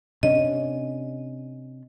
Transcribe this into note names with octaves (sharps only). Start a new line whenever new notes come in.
C3 C#4 D4 D#5